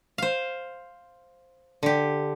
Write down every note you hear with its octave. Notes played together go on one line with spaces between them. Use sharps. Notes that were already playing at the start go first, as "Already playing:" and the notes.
C5 F5
D3 G4